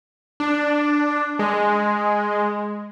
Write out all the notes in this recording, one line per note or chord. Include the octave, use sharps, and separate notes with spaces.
D4
G#3